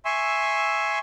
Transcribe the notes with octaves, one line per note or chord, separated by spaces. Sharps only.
E5 G#5 C6 C#6 E6